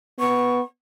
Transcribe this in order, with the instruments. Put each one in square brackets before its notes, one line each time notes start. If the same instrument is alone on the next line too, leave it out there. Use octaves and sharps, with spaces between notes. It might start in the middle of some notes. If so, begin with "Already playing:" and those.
[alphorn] B3 [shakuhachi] C#6